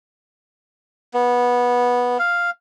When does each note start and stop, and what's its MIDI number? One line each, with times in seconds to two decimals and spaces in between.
1.14 2.18 59
2.19 2.50 77